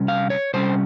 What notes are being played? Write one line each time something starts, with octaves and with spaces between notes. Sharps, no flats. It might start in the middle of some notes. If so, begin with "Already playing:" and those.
Already playing: C3 G3 C#4
F5
C#5
C3 G3 C#4 C5